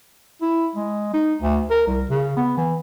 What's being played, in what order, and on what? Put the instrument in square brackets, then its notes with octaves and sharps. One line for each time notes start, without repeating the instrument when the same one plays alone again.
[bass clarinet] E4
G#3
D#4
D2
A#4
C2
C#3
B3
E3